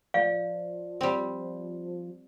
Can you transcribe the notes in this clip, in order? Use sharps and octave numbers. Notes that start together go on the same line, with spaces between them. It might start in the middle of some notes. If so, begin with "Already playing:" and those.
F3 D5 F5
G3 C4